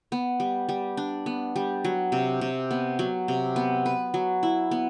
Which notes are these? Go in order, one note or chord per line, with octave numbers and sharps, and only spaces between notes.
B3
G3
G3
D4
B3
G3
F#3
C3
C3
B3
F#3
C3
B3
B4
F#3
E4
B3